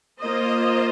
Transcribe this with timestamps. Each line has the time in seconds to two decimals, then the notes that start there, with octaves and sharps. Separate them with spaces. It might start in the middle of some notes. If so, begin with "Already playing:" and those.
0.20 A#3 F4 C5 D#5